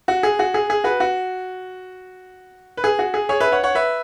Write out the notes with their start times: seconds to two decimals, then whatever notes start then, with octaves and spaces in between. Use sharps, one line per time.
0.08 F#4
0.23 G#4
0.39 F#4
0.54 G#4
0.70 G#4
0.84 F#4 B4
1.00 F#4
2.77 B4
2.84 G#4
2.99 F#4
3.14 G#4
3.29 G#4 C#5
3.40 B4 E5
3.52 C#5 F#5
3.63 C#5 F#5
3.75 B4 E5